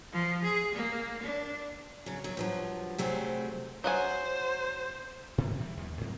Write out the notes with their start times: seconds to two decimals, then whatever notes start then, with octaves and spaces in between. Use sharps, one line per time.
0.13 F3
0.43 G#4
0.75 A#3
1.22 D4
2.06 C#3 F#3
2.24 D#2 F#3
2.37 G2 F3 F#3
2.98 C3 F#3 G3 A3 G#4 C5
3.84 F#3 C5 F#5 G#5
5.38 G#2 C3 E3 C4
5.60 E3 G3
5.77 D#2
6.01 G#2 F#3 C4